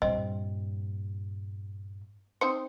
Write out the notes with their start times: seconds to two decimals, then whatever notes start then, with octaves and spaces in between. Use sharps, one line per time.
0.02 G2 A#2 C4 D#5
2.41 C4 D#4 C5 C#7